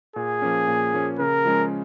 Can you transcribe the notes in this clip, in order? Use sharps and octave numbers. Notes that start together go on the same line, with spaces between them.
A#2 G#4
F3 A#3 C#4
A#2
F3 A#3 C#4
C#3 A#4
F3 G#3 C#4